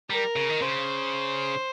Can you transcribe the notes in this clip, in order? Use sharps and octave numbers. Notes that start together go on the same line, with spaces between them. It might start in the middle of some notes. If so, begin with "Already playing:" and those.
G3 A#4
C#3
D#3
C#3 C5